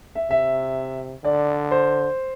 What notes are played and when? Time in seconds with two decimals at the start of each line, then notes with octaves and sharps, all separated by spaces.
0.15 E5
0.30 C3 E5
1.24 D3 D5
1.71 C5